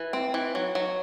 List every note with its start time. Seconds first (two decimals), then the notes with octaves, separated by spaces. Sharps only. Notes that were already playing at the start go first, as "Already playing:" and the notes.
Already playing: E3
0.13 C4
0.34 E3
0.55 F#3
0.75 F#3